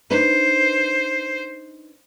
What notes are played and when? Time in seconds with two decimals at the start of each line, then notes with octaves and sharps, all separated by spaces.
0.11 D4 D#4 B4 C5